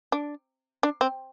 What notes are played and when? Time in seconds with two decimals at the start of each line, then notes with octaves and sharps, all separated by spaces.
0.12 D4
0.83 D4
1.01 C4